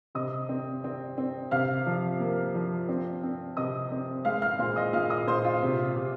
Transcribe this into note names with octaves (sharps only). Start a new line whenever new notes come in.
C3 D#5 D#6
C4
C4
C4
C3 F5 F6
F3
A#3
F3
C4
C4
C3 D#5 D#6
C4
G#3 F5 F6
F5 F6
A#2 C5 C6
D#5 D#6
A#2 F5 F6
D#5 D#6
A#2 C5 C6
F4 F5
C3
C3